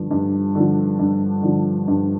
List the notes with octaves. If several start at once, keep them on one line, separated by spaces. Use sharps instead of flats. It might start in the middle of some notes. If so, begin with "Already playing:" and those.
Already playing: G2 D3 F3
G2
D3 F3
G2
D3 F3
G2